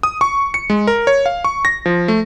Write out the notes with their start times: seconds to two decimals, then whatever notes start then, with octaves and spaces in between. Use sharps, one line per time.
0.03 D#6
0.21 C#6
0.54 C#7
0.70 G#3
0.87 A#4
1.07 C#5
1.26 F5
1.44 C#6
1.65 A#6
1.86 F3
2.08 A3